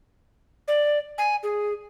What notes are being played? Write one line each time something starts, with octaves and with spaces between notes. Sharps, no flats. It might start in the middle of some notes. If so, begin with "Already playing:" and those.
D5
G#5
G#4